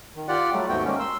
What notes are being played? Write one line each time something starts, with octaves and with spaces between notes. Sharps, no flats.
D#3
F4 G4 D5 F#5
F#3 G3 A3
D#2 G#2 A3 B3 F#4 G5
G#3 A#3 C#4
C6 E6